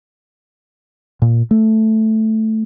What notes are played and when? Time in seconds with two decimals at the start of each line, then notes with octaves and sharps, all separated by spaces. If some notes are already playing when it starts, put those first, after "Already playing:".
1.22 A#2
1.51 A3